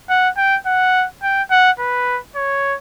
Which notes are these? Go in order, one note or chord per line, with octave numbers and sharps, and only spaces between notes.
F#5
G5
F#5
G5
F#5
B4
C#5